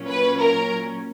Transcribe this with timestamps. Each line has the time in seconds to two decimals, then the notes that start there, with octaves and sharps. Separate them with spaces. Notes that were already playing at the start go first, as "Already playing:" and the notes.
Already playing: A#2 F#3 C#4
0.08 B4
0.39 A#4